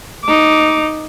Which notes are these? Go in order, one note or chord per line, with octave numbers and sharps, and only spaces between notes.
D#4 D6